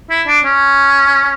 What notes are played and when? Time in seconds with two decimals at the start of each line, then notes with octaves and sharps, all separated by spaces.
0.10 E4
0.27 D4
0.45 C#4